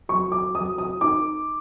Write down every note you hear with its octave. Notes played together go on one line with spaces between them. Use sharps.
F#3 C#6
D6
F#3 D#6
D#6
D#4 D6